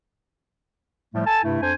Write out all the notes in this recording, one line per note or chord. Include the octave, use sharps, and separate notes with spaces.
A2 F3 G3 A3
A4 G#5 A5
G2 C3 A3 E4
F2 D4 C5 G#5